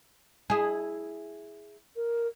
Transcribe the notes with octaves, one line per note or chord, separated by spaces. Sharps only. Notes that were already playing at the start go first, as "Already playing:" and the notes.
E4 G#4
A#4